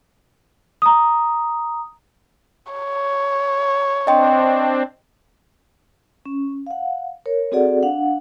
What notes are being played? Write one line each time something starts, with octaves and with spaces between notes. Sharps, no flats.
A#5 D#6
C#5
C4 D4 D#5 G5 C6
C#4
F5 F#5
A#4 C#5
C4 F#4 G#4 A4 D5 F#5
D4 F5 F#5